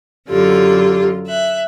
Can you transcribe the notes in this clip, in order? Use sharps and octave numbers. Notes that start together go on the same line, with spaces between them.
F#2 D3 F4 G4
E5 F#6